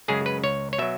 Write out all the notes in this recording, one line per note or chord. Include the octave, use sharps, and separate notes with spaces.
F#2 C#3 G#3 G#4
B4
C#2 C#5
C#5
B2 F#3 E5